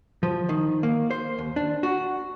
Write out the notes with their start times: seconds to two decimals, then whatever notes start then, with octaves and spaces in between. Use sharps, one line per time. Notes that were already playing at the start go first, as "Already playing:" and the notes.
0.23 F3
0.49 D#3
0.83 A#3
1.11 C5
1.39 D#2
1.56 D4
1.83 F#4